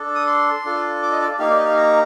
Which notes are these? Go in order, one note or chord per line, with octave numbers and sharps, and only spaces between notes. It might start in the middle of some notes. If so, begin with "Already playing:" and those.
Already playing: D4 A4
D#6
C6
D4 F4 A4
D6
D#5
D5
A#3 D#4 G4 F5
D5
D#5
F5
A#5